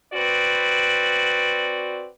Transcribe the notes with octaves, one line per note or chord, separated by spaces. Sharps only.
C4 F#4 B4 D5